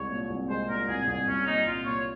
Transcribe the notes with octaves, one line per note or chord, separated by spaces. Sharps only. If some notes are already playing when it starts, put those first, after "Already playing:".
Already playing: C2 G#3 C#5
A#2
C2
G#3 C5
A#2 A#4
C2 G#4
C2 G#4
C2 C#4
A#2 D#4
C2 F4
A#2 C#5